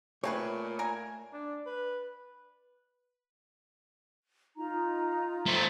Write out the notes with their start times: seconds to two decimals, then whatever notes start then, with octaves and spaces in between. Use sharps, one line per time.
0.24 A#2 A3 C4 G#4 B4 C#5
0.79 A#4 G#5
1.33 D4
1.66 B4
4.57 D#4 F4 A#5
5.46 A3 C4